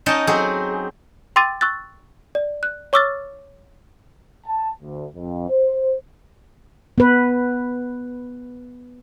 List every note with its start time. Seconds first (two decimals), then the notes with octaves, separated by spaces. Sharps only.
0.06 C#4 D#4 C#5 D#5 G5 A5
0.27 F#3 C4 D#4 G#4
1.36 G5 C6 D6 E6 A6 D#7
1.61 C#6 E6 F#6 A6
2.35 D5
2.63 F#6
2.93 C#5 C#6 D6 E6 F6 A6
4.46 A5
4.82 D2
5.15 F2
5.50 C5
6.98 B3 B4